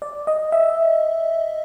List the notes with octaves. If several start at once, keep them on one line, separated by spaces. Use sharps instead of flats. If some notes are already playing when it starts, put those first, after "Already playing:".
D5
D#5
E5